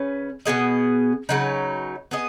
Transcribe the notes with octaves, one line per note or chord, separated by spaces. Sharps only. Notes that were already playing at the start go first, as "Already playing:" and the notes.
Already playing: C#3 C#4 B4
B2 B3 G#4 D#5
C#3 F#3 D#4 B4
B3 G#4 D#5